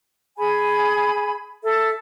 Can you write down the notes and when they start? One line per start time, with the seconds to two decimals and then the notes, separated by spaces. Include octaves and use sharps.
0.38 G#4 G#5 B5
1.64 A4 E5 A5